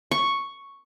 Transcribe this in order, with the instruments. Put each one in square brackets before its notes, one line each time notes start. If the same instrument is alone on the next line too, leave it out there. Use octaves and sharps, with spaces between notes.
[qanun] C#6